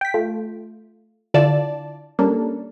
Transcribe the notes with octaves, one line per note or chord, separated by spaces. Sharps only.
G5 B6
A3 F4
D3 E4 F4 D5 A5
G3 A#3 C#4 D4 A4